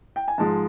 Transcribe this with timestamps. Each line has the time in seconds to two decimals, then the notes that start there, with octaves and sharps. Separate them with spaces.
0.16 G5
0.28 G#5
0.38 G#2 F3 G#3 A5